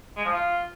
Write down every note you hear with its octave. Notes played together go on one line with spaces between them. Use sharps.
G#3
F3
F4